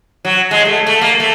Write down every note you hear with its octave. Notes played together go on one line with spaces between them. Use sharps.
F#3
G#3
A3
A3
A#3
A3